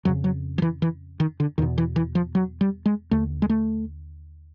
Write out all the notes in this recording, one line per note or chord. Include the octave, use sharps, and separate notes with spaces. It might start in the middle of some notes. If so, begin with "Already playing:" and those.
F2 C#3 F#3
F#3
F3
E3
E3
D#3
D3
E2 B2 D#3
E3
E3
F3
F#3
G3
G#3
D#2 D3 A3
G#3
A3